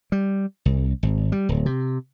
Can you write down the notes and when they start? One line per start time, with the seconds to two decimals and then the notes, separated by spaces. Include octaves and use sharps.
0.12 G3
0.65 C2
1.03 G#1
1.32 G3
1.49 D1
1.66 C3